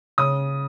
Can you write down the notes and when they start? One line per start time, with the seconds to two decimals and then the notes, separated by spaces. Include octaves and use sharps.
0.18 C#3 D#6